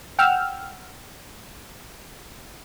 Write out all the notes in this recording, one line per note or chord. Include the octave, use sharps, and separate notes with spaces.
F#5 G5 E6 F6